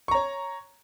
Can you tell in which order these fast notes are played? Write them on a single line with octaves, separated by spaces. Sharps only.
C#6 A#5 C#5